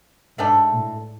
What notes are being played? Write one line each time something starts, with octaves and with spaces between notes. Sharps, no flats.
G#2 B2 A3 D4 A4
A2